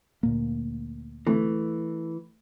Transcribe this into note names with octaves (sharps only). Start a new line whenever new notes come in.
D2 A#2 A#3
E3 A3